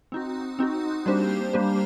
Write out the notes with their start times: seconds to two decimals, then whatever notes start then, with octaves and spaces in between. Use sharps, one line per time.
0.12 C4 D#4 F#4
0.59 C4 D#4 F#4
1.06 G3 A#3 D4 G4 C5
1.53 G3 A#3 D4 G4 C5